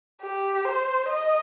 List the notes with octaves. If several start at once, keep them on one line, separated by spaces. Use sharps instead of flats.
G4
C5
D#5